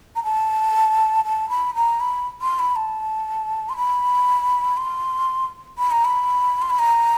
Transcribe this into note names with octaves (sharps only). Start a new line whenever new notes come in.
A#5
A5
A5
B5
A#5
B5
C6
B5
A5
C6
B5
C6
B5
A#5
B5
C6
B5
A#5